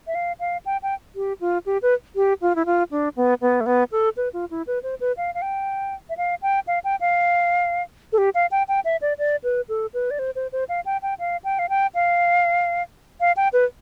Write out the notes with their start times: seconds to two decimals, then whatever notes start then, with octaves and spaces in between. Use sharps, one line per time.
0.07 E5
0.15 F5
0.40 F5
0.66 G5
0.83 G5
1.16 G4
1.41 F4
1.66 G4
1.82 B4
2.16 G4
2.41 F4
2.56 E4
2.66 F4
2.91 D4
3.17 B3
3.41 B3
3.61 A3
3.66 B3
3.92 A4
4.17 B4
4.33 F4
4.51 E4
4.67 B4
4.83 C5
5.00 B4
5.17 F5
5.34 F5
5.42 G5
6.10 E5
6.17 F5
6.42 G5
6.67 F5
6.84 G5
7.01 F5
8.13 A4
8.18 G4
8.35 F5
8.51 G5
8.68 G5
8.85 E5
9.02 D5
9.19 D5
9.44 B4
9.69 A4
9.94 B4
10.11 D5
10.19 C5
10.36 C5
10.53 C5
10.69 F5
10.86 G5
11.02 G5
11.19 F5
11.44 G5
11.59 F5
11.69 G5
11.95 F5
13.20 F5
13.37 G5
13.53 B4